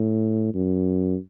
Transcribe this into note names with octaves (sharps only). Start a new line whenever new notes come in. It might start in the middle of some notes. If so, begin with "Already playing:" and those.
Already playing: A2
F#2